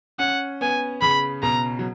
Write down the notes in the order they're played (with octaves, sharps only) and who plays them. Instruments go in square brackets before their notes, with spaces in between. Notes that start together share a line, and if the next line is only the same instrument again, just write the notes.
[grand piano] C#4 [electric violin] F#5
[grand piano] B3 [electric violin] G#5
[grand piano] C#3 [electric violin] B5
[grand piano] B2 [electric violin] A#5
[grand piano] F#3